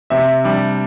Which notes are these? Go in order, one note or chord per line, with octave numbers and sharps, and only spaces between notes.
C3 E5
G3 D4